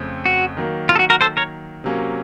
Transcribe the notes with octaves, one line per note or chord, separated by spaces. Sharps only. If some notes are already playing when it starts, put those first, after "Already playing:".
Already playing: F2 C#3 A3 C4
F#4
D#3 F#3 A#3
F4
A4
F#4
F#4 A#4
A4 C5
A#4 C#5
C3 F#3 A#3 C#4